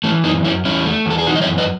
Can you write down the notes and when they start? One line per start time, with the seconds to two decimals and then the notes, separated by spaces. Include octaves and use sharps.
0.04 E3 A3 C#4
0.24 F#2 B3 D#4
0.44 F#2 C#4 E4
0.65 E2 C#4 E4
0.86 A3
1.06 E2 A4
1.18 G#4
1.27 E3 D#4 F#4
1.36 D#5
1.42 C#5 E5
1.47 F#2
1.58 B4 D#5